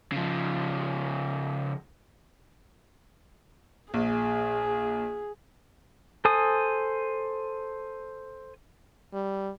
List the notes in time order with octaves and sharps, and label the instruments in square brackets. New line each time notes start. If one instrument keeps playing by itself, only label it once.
[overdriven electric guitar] C#3 F3
[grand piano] A#1 [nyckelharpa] G#4
[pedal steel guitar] A4 C5 G#5 D#6
[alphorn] G3